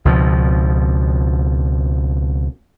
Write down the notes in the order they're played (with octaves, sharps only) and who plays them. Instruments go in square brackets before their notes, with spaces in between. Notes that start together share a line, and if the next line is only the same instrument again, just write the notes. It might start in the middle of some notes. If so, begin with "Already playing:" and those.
[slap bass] C#2 B2 F3